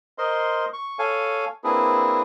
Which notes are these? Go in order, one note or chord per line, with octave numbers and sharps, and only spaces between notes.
A#4 C5 D#5 C6
C#6
A4 C#5 F5 G#5
A#3 C4 D4 E4 G#4 B4